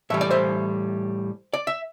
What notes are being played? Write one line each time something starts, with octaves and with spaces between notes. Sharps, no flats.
A2 E3 G3 E5
D5
C5 E5
D5
E5